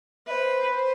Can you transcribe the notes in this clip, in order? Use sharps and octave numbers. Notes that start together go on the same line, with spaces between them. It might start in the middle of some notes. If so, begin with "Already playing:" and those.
B4 C5 E5
C5